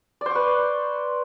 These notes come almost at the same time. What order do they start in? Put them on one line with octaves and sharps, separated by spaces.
D5 C5 C#6 B4